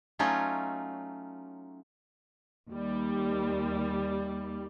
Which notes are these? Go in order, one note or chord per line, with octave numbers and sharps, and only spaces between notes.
F#3 A3 C#4 D#4 F4
D#2 G3